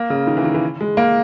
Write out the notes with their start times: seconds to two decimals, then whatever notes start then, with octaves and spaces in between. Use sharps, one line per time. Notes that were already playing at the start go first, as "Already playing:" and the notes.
Already playing: A#3
0.10 C#3
0.27 D#3
0.37 E3
0.44 D#3
0.54 E3
0.81 G#3
0.97 A#3